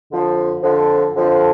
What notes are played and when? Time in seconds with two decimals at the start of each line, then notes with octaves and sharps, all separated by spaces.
0.11 F2 D3 F3
0.62 F2 D3 F3
1.14 F2 D3 F3